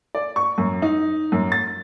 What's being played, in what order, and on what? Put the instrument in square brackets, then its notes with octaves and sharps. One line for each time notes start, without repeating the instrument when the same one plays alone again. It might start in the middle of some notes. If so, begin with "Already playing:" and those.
[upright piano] D5
C#6
F#2
D#4
F#2
A6